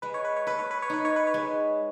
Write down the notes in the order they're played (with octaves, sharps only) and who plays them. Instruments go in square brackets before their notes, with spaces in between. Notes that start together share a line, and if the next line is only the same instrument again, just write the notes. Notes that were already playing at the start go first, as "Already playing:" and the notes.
[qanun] G#3 [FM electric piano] B4
[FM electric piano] C#5
B4
C#5
[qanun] A4 [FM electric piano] B4
[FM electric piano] C#5
B4
C#5
[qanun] D#4 [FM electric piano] B4
[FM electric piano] C#5
B4
C#5
[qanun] G#3 [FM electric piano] B4